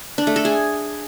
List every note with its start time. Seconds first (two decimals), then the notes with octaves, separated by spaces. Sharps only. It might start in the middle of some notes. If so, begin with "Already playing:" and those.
0.18 D4
0.27 A3
0.36 A4
0.45 G#4